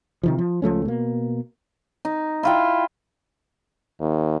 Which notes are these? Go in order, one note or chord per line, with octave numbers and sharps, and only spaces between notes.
C3 D#3 F3
F3
C#2 F3 A3 C#4
B2 A#3
D#4
E4 F4 G5
D#2